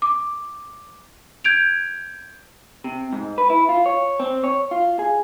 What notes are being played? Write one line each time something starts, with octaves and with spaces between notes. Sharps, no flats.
D6
G6 G#6 D7 F7
C3
G#2
B4
E4
F4
C#5
C4
C#5
F4
G#4